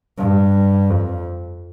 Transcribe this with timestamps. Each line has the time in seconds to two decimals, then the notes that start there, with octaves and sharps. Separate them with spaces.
0.18 G2
0.90 F2